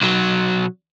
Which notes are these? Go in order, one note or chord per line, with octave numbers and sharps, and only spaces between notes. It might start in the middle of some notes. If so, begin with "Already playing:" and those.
B1 F#3